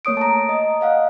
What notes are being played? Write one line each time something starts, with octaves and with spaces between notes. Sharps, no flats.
A3 A#3 C#5 D#6 D7
A5 A#5
D#5
D#5 F5 F#5